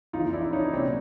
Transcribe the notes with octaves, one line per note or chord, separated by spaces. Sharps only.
F2 C#3 E3 D#4 F4
D4 E4
C#4 D#4
C2 A#2 F#3 C4 D4